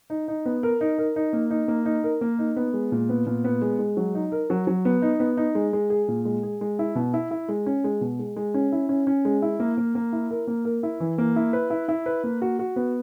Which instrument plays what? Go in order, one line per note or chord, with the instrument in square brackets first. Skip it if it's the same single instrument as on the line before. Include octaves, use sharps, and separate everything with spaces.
[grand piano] D#4
D#4
B3
A#4
D#4
A#4
D#4
A#3
D#4
A#3
D#4
A#4
A#3
D#4
B3
G#3
A#2
B3
A#2
B3
G#3
G#3
F#3
D#4
A#4
F#3
F#3
B3
D#4
B3
D#4
G#3
G#3
G#4
A#2
G#3
G#4
G#3
E4
B2
E4
E4
G#3
C#4
G#3
B2
G#3
G#3
C#4
E4
C#4
C#4
G#3
E4
A#3
A#3
A#3
E4
A#4
A#3
A#4
E4
E3
A#3
E4
B4
E4
E4
B4
A#3
F#4
F#4
B3